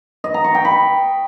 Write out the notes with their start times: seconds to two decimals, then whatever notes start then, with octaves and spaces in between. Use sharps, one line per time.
0.24 D#5
0.34 A#5
0.44 C#6
0.55 G5
0.65 B5